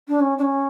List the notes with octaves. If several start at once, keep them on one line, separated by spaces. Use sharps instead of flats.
D4
C#4
D4
C#4